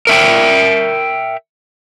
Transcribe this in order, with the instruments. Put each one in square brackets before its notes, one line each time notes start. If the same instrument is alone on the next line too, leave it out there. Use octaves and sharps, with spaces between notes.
[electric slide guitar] A#4 E5 G5